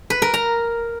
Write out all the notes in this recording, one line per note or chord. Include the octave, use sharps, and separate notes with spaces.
B4
A#4
A#5